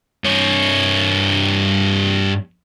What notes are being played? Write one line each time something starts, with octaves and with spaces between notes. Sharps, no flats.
G2 C#5